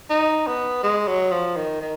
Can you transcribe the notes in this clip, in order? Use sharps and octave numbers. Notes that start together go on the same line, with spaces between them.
D#4
B3
G#3
F#3
F3
D#3
D#3